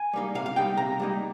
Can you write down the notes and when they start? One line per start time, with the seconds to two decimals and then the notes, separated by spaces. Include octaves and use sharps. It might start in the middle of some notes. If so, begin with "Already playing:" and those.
Already playing: G#5
0.13 G3 A#3 D#4
0.35 C3 F5
0.46 F5
0.56 G3 A#3 D#4 G5
0.77 C3 A#5
0.99 G3 A#3 D#4